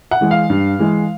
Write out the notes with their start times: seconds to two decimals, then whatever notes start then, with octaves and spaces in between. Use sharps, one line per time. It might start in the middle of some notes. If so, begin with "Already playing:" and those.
0.11 F#5
0.21 E3 G#3
0.31 F5
0.50 G2
0.79 E3 G#3